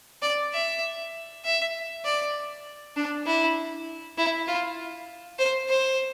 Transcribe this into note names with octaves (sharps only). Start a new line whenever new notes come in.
D5
E5
E5
D5
D4
E4
E4
F4
C5
C5